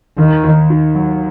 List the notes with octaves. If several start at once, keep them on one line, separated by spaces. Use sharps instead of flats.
D#2 D#3
D#2
D#3
F#3